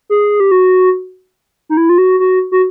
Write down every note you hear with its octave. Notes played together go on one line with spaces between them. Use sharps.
G#4
G4
F#4
D#4
E4
F4
F#4
F#4
F#4